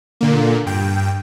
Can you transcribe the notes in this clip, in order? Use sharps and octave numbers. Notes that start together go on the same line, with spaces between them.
A#2 D3 A#3
G2 G5